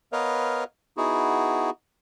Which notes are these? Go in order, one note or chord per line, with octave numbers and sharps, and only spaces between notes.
B3 A#4 B4 C#5 D#5 F5
B3 D#4 E4 F#4 G#4